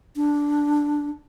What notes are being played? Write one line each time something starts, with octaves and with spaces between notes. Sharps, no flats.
D4